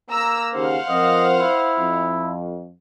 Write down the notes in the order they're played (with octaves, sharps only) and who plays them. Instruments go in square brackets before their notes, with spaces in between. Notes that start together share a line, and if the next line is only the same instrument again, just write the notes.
[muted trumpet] A#3 [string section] A#5 E6
[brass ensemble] D#2 C#3 [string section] C5 F5 F#5
[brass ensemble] F3 C4 A#4 [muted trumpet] D#5
[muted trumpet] E4
[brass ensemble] F2